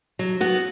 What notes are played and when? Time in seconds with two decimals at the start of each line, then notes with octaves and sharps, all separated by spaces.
0.19 F#3
0.40 B3 F#4